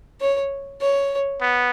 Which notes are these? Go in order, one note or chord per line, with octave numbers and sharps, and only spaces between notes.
C#5
C#5
B3